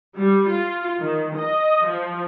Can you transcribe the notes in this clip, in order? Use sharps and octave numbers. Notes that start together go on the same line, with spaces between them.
G3
F4
D#3
D#5
F3